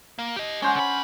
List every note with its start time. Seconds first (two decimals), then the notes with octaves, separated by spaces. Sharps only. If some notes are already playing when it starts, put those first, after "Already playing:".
0.19 A#3
0.36 G4 D#5
0.62 G#3 C#4 C5 F#5
0.75 D3 B5